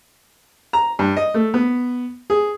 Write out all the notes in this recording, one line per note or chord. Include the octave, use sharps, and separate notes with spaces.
A#5
G2
D#5
A3
B3
G#4